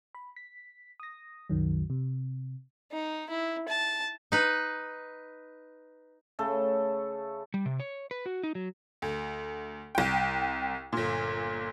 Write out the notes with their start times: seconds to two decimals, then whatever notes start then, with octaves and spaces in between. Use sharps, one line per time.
0.15 B5
0.36 B6
1.00 D#6 A#6
1.50 C2 F#2 D#3 F#3
1.90 C3
2.92 D#4
3.30 E4
3.68 A5
4.32 D#4 B4
6.39 C#3 A3 A4
7.54 G3
7.66 C3
7.80 C#5
8.11 B4
8.26 F#4
8.43 D#4
8.55 F#3
9.02 D2
9.95 C2 G5
10.93 G1 A#2